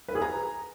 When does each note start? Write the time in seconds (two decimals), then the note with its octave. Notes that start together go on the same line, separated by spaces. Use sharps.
0.08 B4
0.15 G#4
0.22 A#5